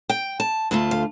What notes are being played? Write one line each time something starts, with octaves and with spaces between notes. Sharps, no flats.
G5
A5
D2 D3 A3 F4 A5
F5